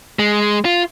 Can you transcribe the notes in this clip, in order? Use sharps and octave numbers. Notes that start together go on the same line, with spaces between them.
G#3
F4